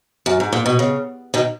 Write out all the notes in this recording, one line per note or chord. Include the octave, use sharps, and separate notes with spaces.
F#2
G#2
A#2
B2
C#3
B2 D#3